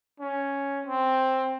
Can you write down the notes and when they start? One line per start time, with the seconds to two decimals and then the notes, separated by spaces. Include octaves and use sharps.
0.20 C#4
0.86 C4